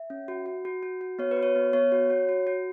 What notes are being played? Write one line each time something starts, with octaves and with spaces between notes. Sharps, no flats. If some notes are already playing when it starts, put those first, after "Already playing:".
Already playing: E5
C#4
F#4
F#4
F#4
F#4
F#4
B3 C#5
B4
F#4
C#5
B3
B3 C#5
F#4
F#4
F#4
F#4